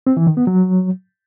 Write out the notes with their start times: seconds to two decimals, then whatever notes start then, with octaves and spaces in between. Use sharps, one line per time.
0.07 C4
0.17 E3
0.27 D#3
0.37 B3
0.47 F#3